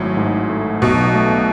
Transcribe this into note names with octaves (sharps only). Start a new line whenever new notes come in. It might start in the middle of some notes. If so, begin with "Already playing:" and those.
Already playing: G#1 A2 F#3
G#2
A3
B1 B2
A3